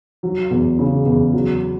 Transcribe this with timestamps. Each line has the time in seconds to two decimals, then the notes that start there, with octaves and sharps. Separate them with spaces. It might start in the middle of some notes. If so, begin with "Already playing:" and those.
0.23 F#3
0.50 E2
0.79 C#3
1.06 E2
1.33 F#3